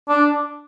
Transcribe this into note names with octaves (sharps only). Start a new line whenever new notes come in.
D4